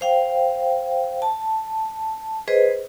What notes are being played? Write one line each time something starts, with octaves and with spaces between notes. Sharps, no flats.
C5 F5 G5
A5
G#4 B4 C5 D#5